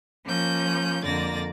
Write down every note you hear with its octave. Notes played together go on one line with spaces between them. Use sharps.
F3 A#3 C#4 G6
F2 D3 A#3 D5 A6 A#6